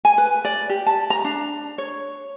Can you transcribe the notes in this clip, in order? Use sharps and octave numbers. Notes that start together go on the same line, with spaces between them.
G#5
B4
D5
G4
A5
A#5
D4
C#5